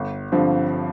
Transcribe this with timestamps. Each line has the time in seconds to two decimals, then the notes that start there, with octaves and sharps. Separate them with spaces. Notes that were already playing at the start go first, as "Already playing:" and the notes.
Already playing: G1
0.32 G2 D3 F3 C4